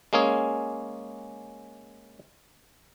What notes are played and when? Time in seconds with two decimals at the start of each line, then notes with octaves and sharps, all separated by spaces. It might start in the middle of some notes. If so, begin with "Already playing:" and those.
0.13 G#3 A#3 C#4 G#4